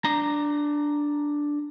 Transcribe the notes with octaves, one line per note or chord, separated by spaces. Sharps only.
D4 A#5